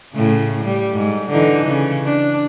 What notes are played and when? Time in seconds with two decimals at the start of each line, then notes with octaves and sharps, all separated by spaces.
0.14 A2 C#3
0.64 G3
0.94 G#2
1.30 D3 E3 D#4
1.66 C#3
2.04 D4